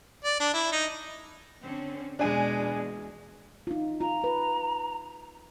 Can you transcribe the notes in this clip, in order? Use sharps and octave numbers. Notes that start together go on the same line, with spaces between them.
D5
D4
E4
D#4
D3 C4 C#4
E2 B2 G#3 D4 G#5
D#4 F4
F4 A#5
B4